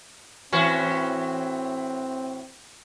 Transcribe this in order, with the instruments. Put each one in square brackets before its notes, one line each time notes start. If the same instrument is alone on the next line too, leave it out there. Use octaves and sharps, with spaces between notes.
[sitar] A2 E3 F#4 [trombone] C4 [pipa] C#4